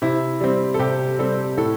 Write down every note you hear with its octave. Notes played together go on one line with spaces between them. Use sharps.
C3 E4
G3 C4
A4
C3 G4
G3 C4 A4
A2 A4